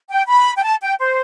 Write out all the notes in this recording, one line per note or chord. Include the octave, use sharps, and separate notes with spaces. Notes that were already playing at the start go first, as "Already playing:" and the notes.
G5
B5
G5
A5
G5
C5